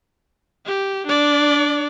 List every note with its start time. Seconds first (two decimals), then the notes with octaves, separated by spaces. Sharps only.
0.66 G4
1.07 D4 D5